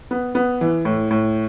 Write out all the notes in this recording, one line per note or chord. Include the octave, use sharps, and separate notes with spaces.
B3
B3
E3
A2
A2